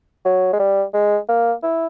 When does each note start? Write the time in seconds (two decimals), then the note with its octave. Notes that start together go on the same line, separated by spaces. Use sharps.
0.25 F#3
0.53 G#3
0.59 G3
0.94 G#3
1.29 A#3
1.63 E4